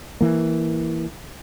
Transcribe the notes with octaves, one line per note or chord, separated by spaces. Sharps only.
E3 A#3